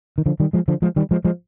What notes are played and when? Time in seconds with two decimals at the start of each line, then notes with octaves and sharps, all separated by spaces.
0.18 D#3
0.26 D3 F3
0.40 D#3 G3
0.53 F3 G#3
0.68 D3 F3
0.82 F3 G#3
0.96 D#3 G3
1.11 F3 G#3
1.25 F3 G#3